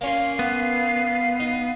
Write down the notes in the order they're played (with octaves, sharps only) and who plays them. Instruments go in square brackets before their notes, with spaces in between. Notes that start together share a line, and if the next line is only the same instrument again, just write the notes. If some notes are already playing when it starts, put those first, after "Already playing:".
[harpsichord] A#3 C#4 F4 [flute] F5
[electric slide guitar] B3
[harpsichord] D#4